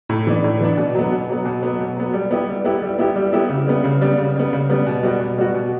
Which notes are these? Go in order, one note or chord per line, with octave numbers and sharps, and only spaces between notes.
A2
E3 B3 D4
A2
E3 B3 D4
B2
F#3 B3
B2
F#3 B3
B2
F#3 B3
B2
F#3 B3
G3
B3 E4 G4
G3
B3 E4 G4
G3
B3 E4 G4
G3
B3 E4 G4
C#3
G3 B3
C#3
G3 B3
C#3
G3 B3
C#3
G3 B3
B2
G3 B3 F#4
B2
G3 B3 F#4
B2